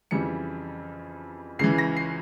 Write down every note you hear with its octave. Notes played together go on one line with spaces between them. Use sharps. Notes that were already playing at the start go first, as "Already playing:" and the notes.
F2 C#3 E3 G3 C#7
C#2 C#3 E3 C7
A#6
C7